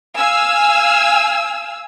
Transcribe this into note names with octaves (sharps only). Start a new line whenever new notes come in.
F5 G#5 E6